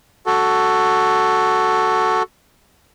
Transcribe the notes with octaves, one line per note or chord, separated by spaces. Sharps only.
F#4 A4